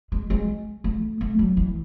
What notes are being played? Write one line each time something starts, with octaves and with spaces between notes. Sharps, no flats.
G#3
G#3
A3
A3
F#3
E3